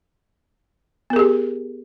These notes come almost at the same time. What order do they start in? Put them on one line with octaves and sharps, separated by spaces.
B3 A#4 G#4 G4